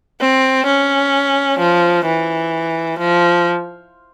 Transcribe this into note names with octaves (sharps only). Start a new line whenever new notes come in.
C4
C#4
F3
E3
F3